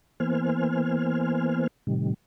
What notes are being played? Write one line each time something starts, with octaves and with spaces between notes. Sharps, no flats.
E3 A#3 B3 C5 G#5 F6
A2 C3 D#3 G3